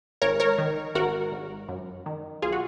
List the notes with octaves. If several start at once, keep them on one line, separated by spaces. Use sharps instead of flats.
G#1 A#4 C#5
A#4 C#5
D#3
G#1 F#4 A#4
G#1
F#2
D#3
B1 F4 G#4
F#4